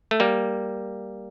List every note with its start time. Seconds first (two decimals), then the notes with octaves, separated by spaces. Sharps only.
0.11 A3
0.20 G3 A#3